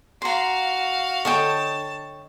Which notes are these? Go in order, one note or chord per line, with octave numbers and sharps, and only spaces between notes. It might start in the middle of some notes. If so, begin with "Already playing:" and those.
F#4 F5 A#5 C6
D3 C#5 D#5 G5 A5